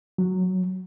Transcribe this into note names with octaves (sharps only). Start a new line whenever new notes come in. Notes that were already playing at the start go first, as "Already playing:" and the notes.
F#3